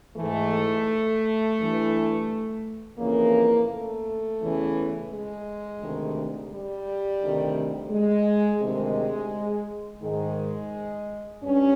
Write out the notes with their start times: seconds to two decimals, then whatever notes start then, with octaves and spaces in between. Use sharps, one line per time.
0.17 G#2 E3 A3
1.58 G2 E3
2.98 F2 C#3 E3 A#3
3.68 A3
4.39 E2 C#3 E3
5.09 G#3
5.80 D2 C3 D#3
6.51 G3
7.20 D2 C3 D#3
7.91 G#3
8.61 D2 C3 D#3 G#3
10.01 G#2 D#3 G#3
11.43 G2 C#4